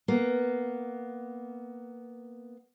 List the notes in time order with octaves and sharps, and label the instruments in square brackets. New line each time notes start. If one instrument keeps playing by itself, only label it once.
[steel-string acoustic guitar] A#3 B3